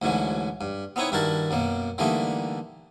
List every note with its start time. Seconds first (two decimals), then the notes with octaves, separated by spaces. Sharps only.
0.02 D2 G#2 E3 F#3 C#4
0.61 G2
0.96 B3 C4 D#4 E4 B4 C#5
1.12 G2 D#3 E4 F#4 A#4 A5
1.51 F#2 B2 A#3
1.98 D3 E3 G3 A3 A#3 D#4